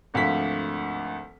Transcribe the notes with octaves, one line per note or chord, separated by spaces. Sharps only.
G#1 D2 F3 B6